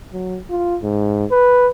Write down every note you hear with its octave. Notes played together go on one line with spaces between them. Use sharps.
F#3
F4
G#2
B4